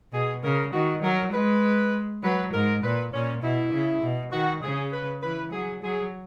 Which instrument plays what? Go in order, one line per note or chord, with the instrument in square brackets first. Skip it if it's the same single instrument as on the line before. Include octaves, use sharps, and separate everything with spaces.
[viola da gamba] B2 [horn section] G#4
[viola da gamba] C#3 [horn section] A#4
[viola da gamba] D#3 [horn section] F#4
[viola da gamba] F#3 [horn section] A#4
[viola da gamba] G#3 [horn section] B4
[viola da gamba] F#3 [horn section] B4
[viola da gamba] G#2 [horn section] A#4
[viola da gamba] A#2 [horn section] B4
[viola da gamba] A#2 [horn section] C#4
[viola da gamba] B2 [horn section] E4
[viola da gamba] C#3
B2
[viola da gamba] D#3 [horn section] F#4
[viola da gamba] C#3 [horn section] G#4
[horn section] B4
[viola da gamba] E3 [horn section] B4
[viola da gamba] F#3 [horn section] G#4
[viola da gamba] F#3 [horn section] G#4